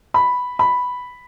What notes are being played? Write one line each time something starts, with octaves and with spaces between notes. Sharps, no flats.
B5
B5